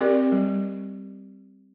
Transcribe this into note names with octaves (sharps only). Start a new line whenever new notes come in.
C4 G4 A#4 D5
G3